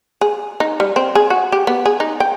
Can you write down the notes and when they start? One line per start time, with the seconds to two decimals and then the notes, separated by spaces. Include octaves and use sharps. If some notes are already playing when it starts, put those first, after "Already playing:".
0.21 G#4
0.60 D#4
0.80 G3
0.96 C4
1.15 G#4
1.30 F#4
1.52 G4
1.67 B3
1.86 G#4
2.00 D#4
2.20 G5